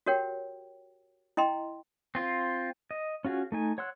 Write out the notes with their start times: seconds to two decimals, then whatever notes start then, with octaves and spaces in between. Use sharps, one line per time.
0.06 F#4 G4 A#4 C#5 F#5 G5
1.37 E4 D#5 G5 A#5 C6
2.15 C4 F4
2.91 D#5
3.25 C#4 F4 F#4 G#4
3.52 A3 D#4 G#5
3.78 C#5 F#5 C6 E6 F#6